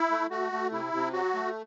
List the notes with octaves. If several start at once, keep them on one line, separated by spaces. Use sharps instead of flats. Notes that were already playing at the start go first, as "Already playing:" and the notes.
Already playing: E4
A3
A3 F#4
A3
C3 E4
C3
F#3 F#4
A3